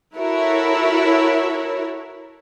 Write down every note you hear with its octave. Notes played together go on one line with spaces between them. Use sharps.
E4 F#4 A4 A#4 C#5 E5